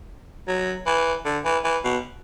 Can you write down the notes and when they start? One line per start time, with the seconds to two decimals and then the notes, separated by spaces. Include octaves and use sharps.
0.48 F#3
0.87 E3
1.25 D3
1.45 E3
1.64 E3
1.84 B2